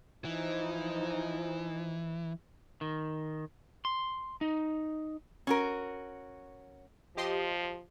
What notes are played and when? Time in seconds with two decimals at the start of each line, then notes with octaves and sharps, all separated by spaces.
0.25 E3 F3 D#4
2.81 D#3
3.85 C6
4.41 D#4
5.47 C#4 F#4 A#4
7.17 F3 G4 D#5 C6